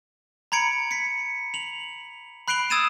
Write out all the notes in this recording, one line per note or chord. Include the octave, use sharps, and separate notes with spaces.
A#5 B5 G#6 C#7 D7
B6 C#7
F7 F#7
B5 F#6 C7 D7 F7 G7
D#6 E6 G#6 A6 D#7 E7